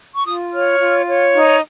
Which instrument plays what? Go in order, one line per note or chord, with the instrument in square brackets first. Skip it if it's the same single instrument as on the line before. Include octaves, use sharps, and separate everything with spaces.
[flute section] C#6
F4 D#6
C#5 F6
F4
C#5
D#4